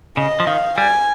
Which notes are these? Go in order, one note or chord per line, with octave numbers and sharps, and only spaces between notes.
C#3 D#5
F3
D#3 F5
G3 G#5